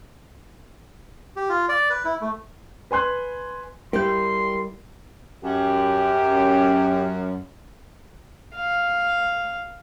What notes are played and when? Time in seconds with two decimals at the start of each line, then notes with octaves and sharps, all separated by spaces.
1.36 G4
1.49 F4
1.69 D5
1.90 B4
2.05 E4
2.21 A3
2.91 B4 G#5 C6 F#6
3.93 G3 E4 G4 A#4 C6 G6
5.44 F#2 G4
8.55 F5